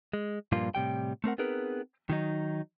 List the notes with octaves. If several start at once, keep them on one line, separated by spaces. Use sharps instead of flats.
G#3
G2 A#2 F3 G3 A#3 F4
A2 C3 G3 G5
A3 C4 A#4 F#5
B3 C4 D#4 G#4 A#4 B4
D#3 F#3 D#4